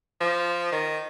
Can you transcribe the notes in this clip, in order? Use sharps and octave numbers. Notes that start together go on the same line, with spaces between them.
F3
D#3